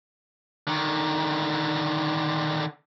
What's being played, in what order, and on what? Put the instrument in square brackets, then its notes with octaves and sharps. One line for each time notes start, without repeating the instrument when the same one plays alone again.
[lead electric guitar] D3 D#3